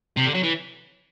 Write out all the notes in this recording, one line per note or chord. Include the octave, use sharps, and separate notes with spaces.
C3
D3
F#3
E3